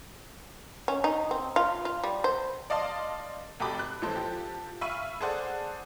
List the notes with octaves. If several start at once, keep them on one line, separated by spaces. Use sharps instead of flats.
C#4
D#4
C4
F4
F4
G3
C5
D5 D#5 F5 A5 C6
F1 F#4 G4 A4 B5 D6
F#6
A1 E3 F3 G#3 A4 C5
F3 G4 A4
E5 F5 B5 C#6 F6 D#7
G#4 A4 C5 D5 F#5